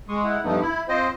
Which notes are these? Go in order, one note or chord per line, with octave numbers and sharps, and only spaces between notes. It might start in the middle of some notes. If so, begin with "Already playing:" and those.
G#3 C6 C#6 D#6
E4 F#5
G2 F3 A3 B3 D#4
E4 B5
C4 F4 C5 D#5 G5